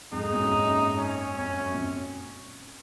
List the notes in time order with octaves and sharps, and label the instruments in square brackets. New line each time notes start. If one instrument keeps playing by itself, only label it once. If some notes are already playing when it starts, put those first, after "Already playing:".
[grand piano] F2 G#2 [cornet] D#4
[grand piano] G#2
F#2 A#2
F#2
[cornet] C#4
[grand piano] F2 [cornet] C#4
[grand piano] F#2
A#2